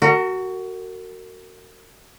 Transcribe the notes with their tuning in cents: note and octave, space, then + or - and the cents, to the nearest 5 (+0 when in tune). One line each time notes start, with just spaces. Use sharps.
F#4 +15 A#4 -35